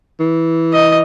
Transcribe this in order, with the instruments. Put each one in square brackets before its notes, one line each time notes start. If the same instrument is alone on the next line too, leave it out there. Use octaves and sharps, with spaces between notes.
[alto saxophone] E3
[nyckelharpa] D#5